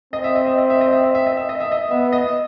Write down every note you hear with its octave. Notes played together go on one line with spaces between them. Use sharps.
C4 D#5
E5
D#5
E5
D#5
E5
D#5
E5
D#5
E5
D#5
E5
D#5
E5
D#5
B3 E5
D#5